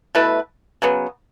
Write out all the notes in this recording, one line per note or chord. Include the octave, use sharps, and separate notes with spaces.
B2 A3 E4 B4
C#3 F#3 B3